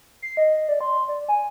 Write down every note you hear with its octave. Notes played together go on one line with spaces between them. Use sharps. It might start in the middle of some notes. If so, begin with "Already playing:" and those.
C7
D#5
D5
C6
D5
G#5